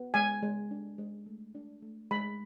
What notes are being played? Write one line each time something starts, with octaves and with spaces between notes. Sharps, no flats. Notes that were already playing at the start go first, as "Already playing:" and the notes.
Already playing: B3
G#3 G#5
G#3
D4
G#3
A3
D4
A3
G#3 B5